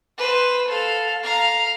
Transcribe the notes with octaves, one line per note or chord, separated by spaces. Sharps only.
B4 C5
A4 F5
F5 A#5